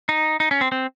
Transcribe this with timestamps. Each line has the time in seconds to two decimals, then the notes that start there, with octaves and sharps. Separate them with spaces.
0.09 D#4
0.40 D#4
0.51 C#4
0.61 C4
0.72 C4